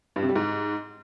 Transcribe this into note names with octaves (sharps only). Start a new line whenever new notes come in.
G2
C3
G3
G#2